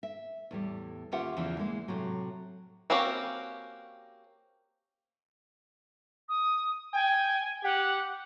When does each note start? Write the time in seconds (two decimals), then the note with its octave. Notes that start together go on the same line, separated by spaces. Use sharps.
0.03 E5
0.51 E2 A2 G3
1.12 D#2 C#4 F4 G4 E5 F#5
1.37 E2 C#3 E3 F3
1.59 G#3 A#3 E4
1.88 A2 C3 F#3
2.90 A#3 C4 C#4 F#4 G4
6.29 D#6
6.94 G5 G#5
7.64 G4 F#5